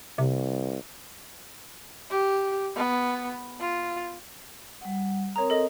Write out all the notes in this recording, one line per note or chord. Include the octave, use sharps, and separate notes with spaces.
C2 C3
G4
B3
F4
G3 F#5
C4 A#4 C#5 A#5 D#6
A4 D#5